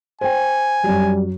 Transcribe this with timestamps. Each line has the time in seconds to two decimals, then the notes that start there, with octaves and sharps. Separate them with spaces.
0.21 C5 G5 G#5
0.84 F#2 F#3 G3